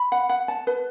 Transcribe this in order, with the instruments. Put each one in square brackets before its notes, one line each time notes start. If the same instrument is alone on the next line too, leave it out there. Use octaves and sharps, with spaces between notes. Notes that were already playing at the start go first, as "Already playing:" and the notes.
Already playing: [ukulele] B5
F#5
F#5
A5
B4